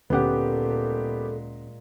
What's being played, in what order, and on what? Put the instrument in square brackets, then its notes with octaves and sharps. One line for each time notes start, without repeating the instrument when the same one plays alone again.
[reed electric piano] D2 C#4 F#5 [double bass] A#2 G#3 [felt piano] B3 G4 [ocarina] A4